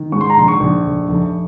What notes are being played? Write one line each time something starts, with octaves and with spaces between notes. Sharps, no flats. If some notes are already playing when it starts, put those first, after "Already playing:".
Already playing: D#3
G#2 C#6
C6
A#5
A#1 C6
C#6
A#1
F1
F1